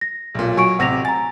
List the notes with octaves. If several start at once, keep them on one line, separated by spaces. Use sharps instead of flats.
A#6
B1 A#2
F#3 G#5 C#6 D7
A1 C3 F#5 A#6 F7
G#5 A#5 A6